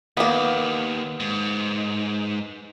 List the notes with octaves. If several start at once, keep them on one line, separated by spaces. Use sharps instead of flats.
D#2 A#3 B3
G#2